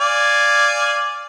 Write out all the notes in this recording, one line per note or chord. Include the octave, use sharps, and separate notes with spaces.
D5 F5 G#5